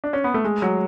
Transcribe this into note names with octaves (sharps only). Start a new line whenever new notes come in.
D4
C#4
B3
A3
G#3
F#3